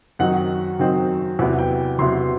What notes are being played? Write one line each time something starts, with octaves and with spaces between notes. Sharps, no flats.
F#2 D#3 F#3 C4 D#4 F#5
F#2 D#3 F#3 C4 D#4
E2 C3 F#3 B3 E4 F#5
G5
E2 C3 F#3 B3 E4 C6